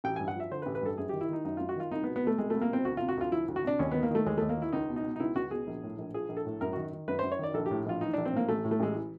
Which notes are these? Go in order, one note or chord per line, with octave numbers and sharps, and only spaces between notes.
A1 G5
G2 G#5
F#5
F3 E5
D3 C5
B4
A1
B4
G2 A4
F#2 G#4
D#3 G4
E4
D#3 D#4
F#2 D#4
F#2 F4
F#4
D#3 F4
C2 D#4
B2 B3
B3
B2 A3
C2 G#3
C2 A3
A#3
B2 C4
D2 F#4
C3 F4
F#4
D2 F4
F3 E4
D2
F#4
C3 D4
D#2 C#4
D#3 B3
A#3
D#3 A3
D#2 G#3
D#2 A3
A#3
D#3 E4
C#2 D#4
B2
D#4
B2
D#4
C#2 E4
C#2 F#4
B2 G#4
A#1
A2
A#1
F3 G#4
A#1
A4
A2
F#2 A#4
D#3 F#4
D#3
F#2 B4
F#2 C5
C#5
D#3 D5
A#1 A4
G4
A2
A#1 F4
E3 D#4
A#1 D4
C4
A2 A#3
A1 A3
A2
A3
A1 G#3
E3